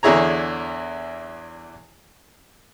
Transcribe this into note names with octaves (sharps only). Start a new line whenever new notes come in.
E2 D3 E4 G#4 C#5 A#5